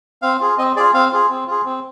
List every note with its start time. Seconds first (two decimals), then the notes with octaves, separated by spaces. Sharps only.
0.22 C4 F5
0.40 F4 G#4
0.58 C4 D#5
0.76 G#4 D5
0.79 F4
0.94 C4 F5
1.12 F4 G#4
1.30 C4
1.47 F4 G#4
1.65 C4